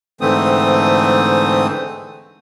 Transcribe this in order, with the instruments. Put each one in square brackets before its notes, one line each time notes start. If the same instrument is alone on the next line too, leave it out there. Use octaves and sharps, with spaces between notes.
[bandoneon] G#2 D3 E3 A3 C4 D#6